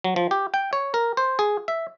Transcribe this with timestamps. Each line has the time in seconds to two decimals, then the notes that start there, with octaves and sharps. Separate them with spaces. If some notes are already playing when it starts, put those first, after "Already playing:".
0.04 F#3
0.16 F3
0.31 G4
0.54 G5
0.73 C#5
0.94 A#4
1.17 C5
1.39 G#4
1.68 E5